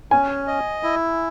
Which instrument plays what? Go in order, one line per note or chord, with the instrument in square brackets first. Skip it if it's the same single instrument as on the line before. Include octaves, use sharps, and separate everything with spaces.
[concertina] C#4 [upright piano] G#5
[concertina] D#5
E4